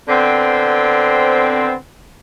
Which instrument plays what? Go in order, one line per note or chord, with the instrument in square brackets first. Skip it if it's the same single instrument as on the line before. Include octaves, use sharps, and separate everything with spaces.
[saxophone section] D3 B3 C4